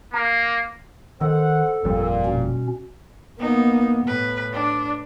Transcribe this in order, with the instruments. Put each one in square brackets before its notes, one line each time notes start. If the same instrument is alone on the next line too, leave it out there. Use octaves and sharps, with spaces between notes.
[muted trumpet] A#3 [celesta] A#5
[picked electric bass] D#3 [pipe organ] A4 [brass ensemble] C5 F#5
[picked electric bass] G1 F2 G3 [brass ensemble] A#2
[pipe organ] B2 C#4
[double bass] A#3 B3 [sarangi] D#4
[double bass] A2 [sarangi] B4
[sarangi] D4